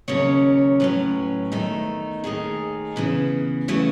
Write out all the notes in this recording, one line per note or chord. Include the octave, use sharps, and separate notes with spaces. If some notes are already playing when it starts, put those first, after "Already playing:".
D#2 C#3 F#3 C#4 C#5
A2 F#3 C#4 B4
E2 D#3 A3 D#4
D#2 D#3 A3 D#4 G#4
C#3 E3 B3
C#3 E3 A3 F#4